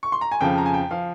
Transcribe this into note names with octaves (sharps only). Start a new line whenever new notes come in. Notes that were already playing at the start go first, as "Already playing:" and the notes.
C#6
C6
A#5
G#5
F2 C#3 F3 G5
A#5
G#5
G5
F3 F5